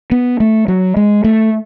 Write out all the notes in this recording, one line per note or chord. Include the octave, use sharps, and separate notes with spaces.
B3
A3
F#3
G#3
A3